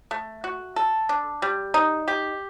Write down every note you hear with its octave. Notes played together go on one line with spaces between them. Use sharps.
A3
F#4
A4
D4
G3
D#4
G4